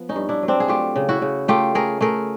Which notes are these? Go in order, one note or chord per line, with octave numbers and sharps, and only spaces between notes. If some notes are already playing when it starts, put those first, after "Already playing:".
Already playing: F3 B3
C#4 D#4
G2
D4 E4
F#3
C4 D4
G#4
A3 F4 G4
C#3
E4 F#4
C#3
A3 F4 G4
A3 G#4 A#4
A3 G#4 A#4